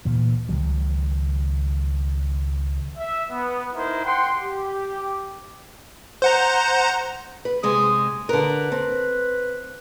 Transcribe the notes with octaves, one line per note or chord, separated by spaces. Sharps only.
D2 A#2 E3
C#2 D#3 F#3
E5
B3
D#4 E4 A#4 C5
F#5 G5 C6
G4
C5 F#5 A#5
B4
C3 G#3 D#6
D3 A#4 B4
C4